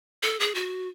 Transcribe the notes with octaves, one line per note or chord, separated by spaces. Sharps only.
A4
G#4
F#4